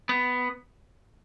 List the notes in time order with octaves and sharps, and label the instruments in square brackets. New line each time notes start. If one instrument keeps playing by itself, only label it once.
[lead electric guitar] B3